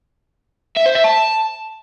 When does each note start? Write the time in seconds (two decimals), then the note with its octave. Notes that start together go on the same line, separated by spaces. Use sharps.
0.77 E5
0.86 C5
0.95 E5
1.04 A5